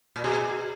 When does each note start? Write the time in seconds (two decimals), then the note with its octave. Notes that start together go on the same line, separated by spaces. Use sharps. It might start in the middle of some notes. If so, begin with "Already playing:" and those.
0.16 A#2
0.24 B2 G#4